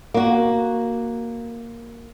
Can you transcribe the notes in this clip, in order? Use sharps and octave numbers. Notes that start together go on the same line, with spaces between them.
A#3 F#4